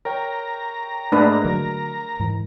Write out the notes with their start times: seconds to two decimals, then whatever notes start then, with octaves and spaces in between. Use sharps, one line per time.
0.05 A#4 C#5 G5 A#5
1.12 G#2 A3 A#3 D4 G#4 B4
1.45 D3 F#3 A#4
2.20 G#2 E3